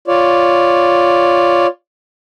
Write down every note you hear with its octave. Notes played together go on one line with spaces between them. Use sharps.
F4 C#5 D5